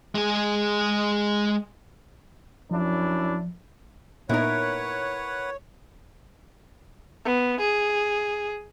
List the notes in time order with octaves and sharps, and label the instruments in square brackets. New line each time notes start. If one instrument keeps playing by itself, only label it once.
[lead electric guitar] G#3 G#4
[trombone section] F#2 D4 E4 [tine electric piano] F3
[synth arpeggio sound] A#2 B3 D#4 [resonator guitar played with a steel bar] E4 A#4 [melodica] B4 F#5 [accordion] C#5
[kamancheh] B3
G#4